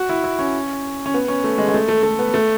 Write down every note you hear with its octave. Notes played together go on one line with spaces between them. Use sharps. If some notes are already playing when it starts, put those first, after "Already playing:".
Already playing: F#4
E4
E4
C#4
C#4
B3
C#4
A3
G#3
G#3
A3
A3
A3
B3
A3